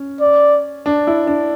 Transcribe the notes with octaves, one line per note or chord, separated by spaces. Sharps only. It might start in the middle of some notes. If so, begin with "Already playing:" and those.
Already playing: C#4
D5
D4
E4
D4